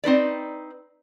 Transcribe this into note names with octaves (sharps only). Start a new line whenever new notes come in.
C4 D#4 B4 D5